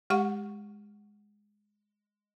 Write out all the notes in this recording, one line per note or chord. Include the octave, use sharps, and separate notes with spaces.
G#3 G4 F5 F#5 C#6